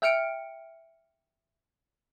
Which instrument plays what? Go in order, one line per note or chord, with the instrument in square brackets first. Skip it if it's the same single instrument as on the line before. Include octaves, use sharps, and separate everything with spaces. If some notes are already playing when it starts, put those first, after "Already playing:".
[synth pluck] E5 G5 F6 C#7 D7